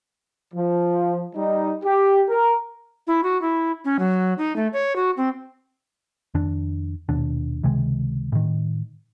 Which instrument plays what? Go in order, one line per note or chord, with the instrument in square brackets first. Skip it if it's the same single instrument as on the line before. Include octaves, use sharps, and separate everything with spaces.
[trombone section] F3
G3 D#4
G4
A#4
[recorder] E4
F#4
E4
C#4
F#3
D#4
A3
C#5
F#4
C4
[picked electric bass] F2 D#3 D4
D#1 D#2 B2 D4
C#2 C3 D#3 G#3
A2 D#3